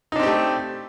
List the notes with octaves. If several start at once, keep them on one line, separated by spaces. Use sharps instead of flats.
A3 C4 D4 D#4 G4